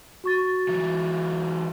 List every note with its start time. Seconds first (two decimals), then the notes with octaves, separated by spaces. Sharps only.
0.24 F#4 C#6 A6
0.69 E3 F#3